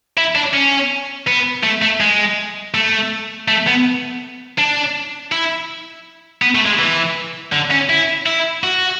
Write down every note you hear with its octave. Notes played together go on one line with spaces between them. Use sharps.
E4
D4
C#4
B3
A3
A3
G#3
A3
A3
B3
D4
E4
B3
A3
G#3
E3
D3
C#4
E4
E4
F#4